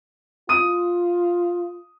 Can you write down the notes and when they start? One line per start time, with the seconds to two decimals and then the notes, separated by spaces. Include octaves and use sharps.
0.49 F4 D#6 D#7